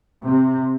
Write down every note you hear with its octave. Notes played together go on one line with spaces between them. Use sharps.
C3